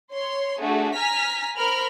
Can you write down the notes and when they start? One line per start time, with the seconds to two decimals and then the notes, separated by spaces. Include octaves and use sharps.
0.13 C#5 C6
0.60 A3 D4 F#4 G#4
0.95 G#5 A#5 F6 B6
1.57 A#4 C5 B5 F6